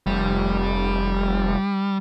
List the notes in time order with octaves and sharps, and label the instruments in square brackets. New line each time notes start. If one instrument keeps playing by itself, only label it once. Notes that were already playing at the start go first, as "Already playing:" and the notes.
[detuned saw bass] F1 [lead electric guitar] G3